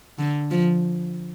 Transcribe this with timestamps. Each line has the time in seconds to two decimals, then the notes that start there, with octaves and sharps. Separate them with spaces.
0.19 D3
0.51 F3